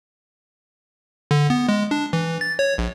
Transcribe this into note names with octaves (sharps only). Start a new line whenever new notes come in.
D3
B3
G#3
D4
E3
A6
C#5
A#1